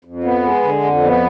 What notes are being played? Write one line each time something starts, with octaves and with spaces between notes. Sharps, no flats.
F2
B3
G#3
D3
F2
B3